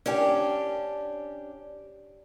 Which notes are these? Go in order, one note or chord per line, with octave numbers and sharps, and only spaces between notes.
C#4 D4 G4